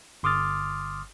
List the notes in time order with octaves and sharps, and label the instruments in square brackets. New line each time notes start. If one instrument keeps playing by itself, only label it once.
[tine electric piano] G1 C6 D6 D#6 F6 A6